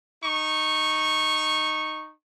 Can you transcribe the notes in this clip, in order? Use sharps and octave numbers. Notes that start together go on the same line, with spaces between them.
D#4 C#6